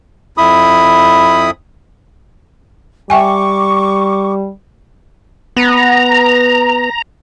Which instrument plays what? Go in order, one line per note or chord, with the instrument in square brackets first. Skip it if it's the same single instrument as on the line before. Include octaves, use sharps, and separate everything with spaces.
[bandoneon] F2 E4 B5 D#6
[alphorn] G3 [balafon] E5 G5 G#5 [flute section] C#6 D6
[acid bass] B3 [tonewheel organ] A#5